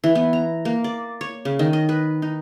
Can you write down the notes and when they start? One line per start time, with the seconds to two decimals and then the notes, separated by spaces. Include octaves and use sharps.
0.04 E3
0.15 B3
0.33 A#5
0.65 A#3
0.84 D5
1.21 C#5
1.45 C#3
1.59 D#3
1.73 D#5
1.89 B4
2.22 D#4